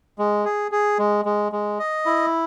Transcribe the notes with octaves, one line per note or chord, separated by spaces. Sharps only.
G#3
G#4
G#4
G#3
G#3
G#3
D#5
E4